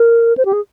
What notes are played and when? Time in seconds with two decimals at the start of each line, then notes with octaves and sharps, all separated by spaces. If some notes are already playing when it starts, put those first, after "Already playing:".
Already playing: A#4
0.37 C5
0.45 G4
0.53 G#4